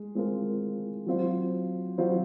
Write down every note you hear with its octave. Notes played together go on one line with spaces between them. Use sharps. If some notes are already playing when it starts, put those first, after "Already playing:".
Already playing: G#3
G#3 C4 F4 A#4
F#3 C4 F4 C5
F#3 C4 F4 C5